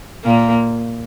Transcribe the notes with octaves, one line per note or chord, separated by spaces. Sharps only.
A#2 A#3